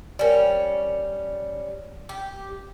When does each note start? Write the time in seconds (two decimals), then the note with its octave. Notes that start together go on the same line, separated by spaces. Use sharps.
0.19 G3 C#4 A#4 D5
2.09 G4